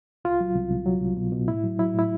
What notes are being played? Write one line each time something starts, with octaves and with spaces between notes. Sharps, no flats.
C2 F4
F#3
C2
C2
F#3
C2
B2
B2
A2 E4
F#3
F#3 E4
A2 E4